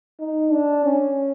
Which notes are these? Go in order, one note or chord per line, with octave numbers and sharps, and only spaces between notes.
D#4
D4
C#4